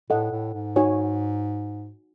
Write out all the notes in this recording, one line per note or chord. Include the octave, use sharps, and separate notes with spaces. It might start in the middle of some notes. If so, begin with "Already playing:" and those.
A2 A4 D#5 F#5
A2
G#2
D#4 F#4 C#5 G#5